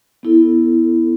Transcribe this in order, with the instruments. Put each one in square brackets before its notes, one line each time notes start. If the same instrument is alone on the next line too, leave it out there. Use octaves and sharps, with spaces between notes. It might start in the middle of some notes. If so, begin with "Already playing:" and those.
[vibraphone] B3 E4 A4